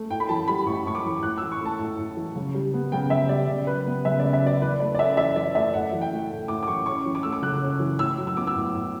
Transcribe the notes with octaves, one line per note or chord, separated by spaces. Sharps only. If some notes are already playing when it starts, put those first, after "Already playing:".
Already playing: A3
A2 G5
B5
E3 A5
G3 B5
A2 C#6
A2 C#6
D6
E3
A2 F#6
E6
E3
C#6
A3 A5
A2
A2
E3
C#3
G3
B3
C#3 G5
C#3 E5
G3 D5
C#3
F#3 B4
B3
C#3 E5
D5
C#3
E5
F#3 D5
E3 B4
A3 D5
D5
C#4 E5
E3 E5
E3 D5
A3 E5
A2 F#5
E3
G5
A3
A2
A2 D6
D6
E3 C#6
C#4 C#6
E3
D6
A3 E6
D6
C#3 F#6
C#4
E3
A2 E6
F#3
E6
B3 D6
E6
A2
A2